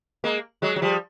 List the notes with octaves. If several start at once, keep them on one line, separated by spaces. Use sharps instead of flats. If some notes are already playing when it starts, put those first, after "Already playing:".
G#3 A#3
F#3 G#3
F#3
F3 G3